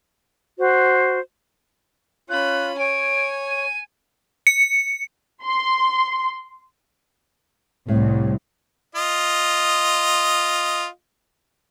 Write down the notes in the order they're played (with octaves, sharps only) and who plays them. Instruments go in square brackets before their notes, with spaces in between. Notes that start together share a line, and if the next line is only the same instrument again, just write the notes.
[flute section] F#4 C5
[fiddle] C#4 B5 [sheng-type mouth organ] F4 [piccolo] F#6
[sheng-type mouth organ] C#5 [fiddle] G#5 [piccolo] D7
[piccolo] D#7
[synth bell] C#7
[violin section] C6
[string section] C2 [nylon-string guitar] A2
[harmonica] F4 D#5